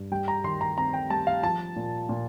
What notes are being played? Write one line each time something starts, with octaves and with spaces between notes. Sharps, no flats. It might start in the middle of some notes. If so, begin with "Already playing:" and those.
Already playing: G2
G3 G5
A#5
D#3 C6
A#5
C4 A#5
G5
G3 A5
F5
F3 A5
A#2
A#2